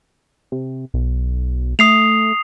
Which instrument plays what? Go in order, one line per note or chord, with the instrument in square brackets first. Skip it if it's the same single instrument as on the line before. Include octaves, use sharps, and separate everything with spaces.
[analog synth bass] C3
B1
[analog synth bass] A3 [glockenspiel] D#6 C7 F7